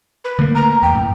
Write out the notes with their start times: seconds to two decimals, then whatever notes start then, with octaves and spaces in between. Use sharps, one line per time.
0.25 B4
0.39 D3 A3 A#3
0.55 A#5
0.82 E2 G5
0.95 F#2 A2